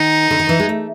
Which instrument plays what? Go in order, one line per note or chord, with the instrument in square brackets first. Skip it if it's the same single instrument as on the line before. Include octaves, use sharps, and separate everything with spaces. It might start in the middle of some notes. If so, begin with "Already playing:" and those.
Already playing: [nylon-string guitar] D#3 [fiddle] D#4
[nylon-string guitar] D3
D#3
E3
G#3
A3